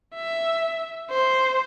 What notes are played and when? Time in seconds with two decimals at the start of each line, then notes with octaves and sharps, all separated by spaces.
0.15 E5
1.10 C5